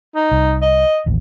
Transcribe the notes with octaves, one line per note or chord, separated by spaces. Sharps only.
D#4
C2
D#5
A1 D#2